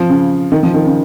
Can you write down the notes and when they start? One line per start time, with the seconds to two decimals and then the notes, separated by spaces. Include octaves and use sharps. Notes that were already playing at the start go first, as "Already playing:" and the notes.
Already playing: F3
0.09 C#3
0.52 D#3
0.63 F3
0.74 D#3
0.85 C#3